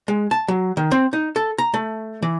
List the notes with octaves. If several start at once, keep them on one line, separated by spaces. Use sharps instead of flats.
G#3
A5
F#3
D#3
C4
D#4
A4
A#5
A3
E3